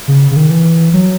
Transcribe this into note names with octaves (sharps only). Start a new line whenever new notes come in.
C#3
C#3
D#3
E3
F#3